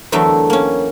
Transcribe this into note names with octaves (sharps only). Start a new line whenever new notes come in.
E2 D3 F#3 A3 A#4 E5
A#3 C#4